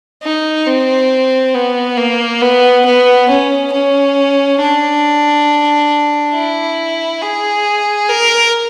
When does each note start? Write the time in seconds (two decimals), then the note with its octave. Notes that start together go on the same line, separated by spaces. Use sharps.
0.23 D#4
0.66 C4
1.54 B3
1.97 A#3
2.41 B3
2.85 B3
3.29 C#4
3.72 C#4
4.60 D4
6.34 E4
7.22 G#4
8.10 A#4